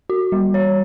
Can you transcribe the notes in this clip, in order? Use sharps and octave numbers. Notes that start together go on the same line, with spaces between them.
F#4
G3
C#5